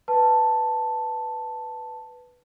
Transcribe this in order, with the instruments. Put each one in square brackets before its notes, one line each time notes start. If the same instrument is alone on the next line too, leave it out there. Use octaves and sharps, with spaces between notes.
[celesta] B4 A5